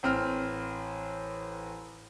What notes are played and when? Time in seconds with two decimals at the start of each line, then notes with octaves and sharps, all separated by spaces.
0.03 A1 C4 F6